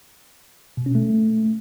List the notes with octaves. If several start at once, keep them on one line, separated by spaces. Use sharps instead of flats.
B2
C#4
A3